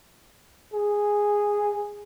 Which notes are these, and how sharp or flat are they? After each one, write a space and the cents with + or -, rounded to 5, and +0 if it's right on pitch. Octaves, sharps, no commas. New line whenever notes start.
G#4 -5